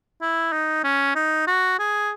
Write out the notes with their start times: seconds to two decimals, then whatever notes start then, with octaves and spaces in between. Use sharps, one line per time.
0.21 E4
0.53 D#4
0.84 C#4
1.15 D#4
1.47 F#4
1.79 G#4